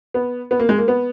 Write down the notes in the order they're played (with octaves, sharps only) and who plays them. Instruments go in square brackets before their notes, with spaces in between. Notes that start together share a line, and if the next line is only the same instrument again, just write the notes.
[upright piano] B3
B3
A#3
G#3
A#3
B3